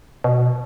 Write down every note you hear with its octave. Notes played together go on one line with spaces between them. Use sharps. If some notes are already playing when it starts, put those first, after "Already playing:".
B2